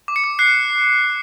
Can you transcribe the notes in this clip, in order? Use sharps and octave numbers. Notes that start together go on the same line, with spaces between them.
D6
C#7
D6
F#6 C7